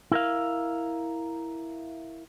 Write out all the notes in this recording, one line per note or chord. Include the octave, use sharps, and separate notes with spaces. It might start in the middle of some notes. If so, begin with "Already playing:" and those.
E4 A#4 F5